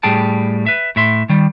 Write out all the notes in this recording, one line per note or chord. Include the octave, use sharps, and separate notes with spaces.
A2 G3 G#4 G5 A5
B4 E5
A2 E5 C6
D#3 G3